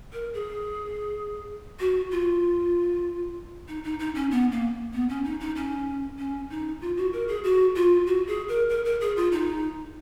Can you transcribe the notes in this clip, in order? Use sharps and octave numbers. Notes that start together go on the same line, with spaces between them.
A#4
G#4
F#4
F4
D#4
D#4
D#4
C#4
B3
A#3
B3
C#4
D#4
D#4
C#4
C#4
D#4
F4
F#4
A#4
G#4
F#4
F4
F#4
G#4
A#4
A#4
A#4
G#4
F4
D#4